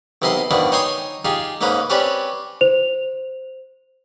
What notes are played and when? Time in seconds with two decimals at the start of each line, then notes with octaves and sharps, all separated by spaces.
0.22 B1 C3 E4 A#4 D#5 C6
0.51 B2 D#3 F3 D4 E4
0.72 D#4 C#5 G5 G#5 C6 D#6
1.25 D#4 F4 G4 G#4
1.61 G#2 A#3 C#4 B4 A#5
1.90 C4 C#4 G4 B4 C#5 D5
2.61 C5 F7